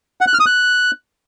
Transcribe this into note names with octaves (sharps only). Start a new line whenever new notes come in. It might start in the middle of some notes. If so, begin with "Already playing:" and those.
F#5
F#6
F6
D#6
F#6